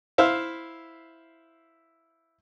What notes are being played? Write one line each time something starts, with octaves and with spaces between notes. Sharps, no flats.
E4 C5 E5 F5